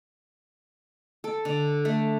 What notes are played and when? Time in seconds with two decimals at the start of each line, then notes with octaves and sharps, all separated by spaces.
1.24 A4
1.45 D3
1.85 A3